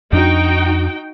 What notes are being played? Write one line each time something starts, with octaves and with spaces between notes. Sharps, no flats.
F2 D4 D#4 F#4 G5